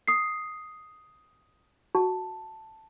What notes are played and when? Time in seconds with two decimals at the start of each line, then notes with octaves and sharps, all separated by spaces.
0.08 D#6 C7
1.95 F#4 A5